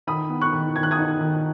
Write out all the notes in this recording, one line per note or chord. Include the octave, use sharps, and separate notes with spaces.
D#3 B5 D#6
B3
C#6 F#6
D#3
D#3 G#6
F#6
D#6 G#6
D#4
D#3